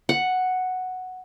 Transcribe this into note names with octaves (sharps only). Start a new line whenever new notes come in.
F#5